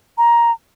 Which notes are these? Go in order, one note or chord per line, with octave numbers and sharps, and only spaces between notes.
A#5